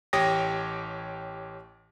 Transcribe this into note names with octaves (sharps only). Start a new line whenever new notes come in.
A1 G4 C#5 G5 D#6 A#6